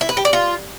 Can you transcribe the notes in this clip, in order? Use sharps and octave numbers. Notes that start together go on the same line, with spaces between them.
E4
B4
G4
D5
F4